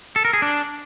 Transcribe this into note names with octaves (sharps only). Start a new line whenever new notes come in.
A4
A#4
G#4
D4